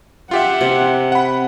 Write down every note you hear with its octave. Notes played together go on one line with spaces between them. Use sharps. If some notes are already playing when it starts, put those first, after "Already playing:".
F4 G4 E5 F#5
C3 C4
F#5 B5